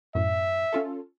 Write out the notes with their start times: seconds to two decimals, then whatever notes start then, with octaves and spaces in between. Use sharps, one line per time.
0.15 F#2 A2 E5
0.72 C#4 F4 A4